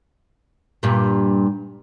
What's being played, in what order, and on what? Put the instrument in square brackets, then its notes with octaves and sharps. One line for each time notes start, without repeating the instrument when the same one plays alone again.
[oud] G2 A#2